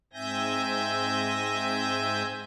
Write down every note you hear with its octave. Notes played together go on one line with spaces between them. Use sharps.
G#2 C4 E5 G#5 G6 A#6